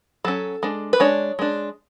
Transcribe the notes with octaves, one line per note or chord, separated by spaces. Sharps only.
F#3 C#4 A4
G#3 D4
B4
G#3 D4 C#5
G#3 D4